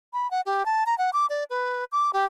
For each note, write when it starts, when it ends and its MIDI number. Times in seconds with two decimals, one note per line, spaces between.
0.13 0.30 83
0.31 0.41 78
0.46 0.65 67
0.66 0.84 81
0.86 0.97 82
0.98 1.10 78
1.13 1.26 86
1.30 1.44 74
1.50 1.84 71
1.92 2.11 86
2.13 2.25 67